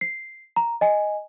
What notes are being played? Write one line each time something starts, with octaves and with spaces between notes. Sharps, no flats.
C7
A#5
D#5 G#5